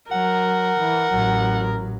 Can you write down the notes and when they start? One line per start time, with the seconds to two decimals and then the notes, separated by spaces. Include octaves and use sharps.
0.11 F#3 A#4 F#5
0.80 E3
1.11 A1 F#3